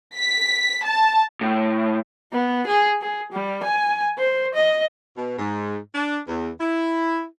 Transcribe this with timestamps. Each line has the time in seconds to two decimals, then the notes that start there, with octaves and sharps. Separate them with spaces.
0.16 B6
0.85 A5
1.41 A2
2.32 B3
2.67 G#4
3.01 G#4
3.32 G3
3.63 G#5
4.18 C5
4.55 D#5
5.16 B2
5.38 G#2
5.94 D4
6.28 E2
6.60 E4